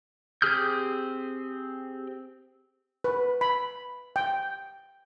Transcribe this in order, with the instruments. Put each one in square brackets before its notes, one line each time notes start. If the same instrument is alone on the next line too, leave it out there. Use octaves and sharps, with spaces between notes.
[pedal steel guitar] C4 G4 G#4 F6 G6
[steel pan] B4
B5
G5